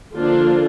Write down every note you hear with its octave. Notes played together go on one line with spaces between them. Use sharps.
D3 F3 A#3 D4 F4